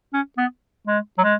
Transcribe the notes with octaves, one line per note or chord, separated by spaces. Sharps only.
C#4
B3
G#3
F#3
G#3